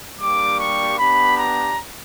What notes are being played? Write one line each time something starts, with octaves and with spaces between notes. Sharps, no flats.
G3 A#3 D4 G4 D6
C#6
B3 D4 G4 B5
A#5